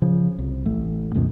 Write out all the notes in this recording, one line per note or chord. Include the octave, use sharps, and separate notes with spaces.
C#3 F3
C2
A1 A3
C#2 F#2 B2 D#3